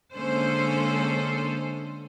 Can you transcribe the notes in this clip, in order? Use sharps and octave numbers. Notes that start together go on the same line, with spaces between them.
D3 G#3 A#3 C#4 A4 C5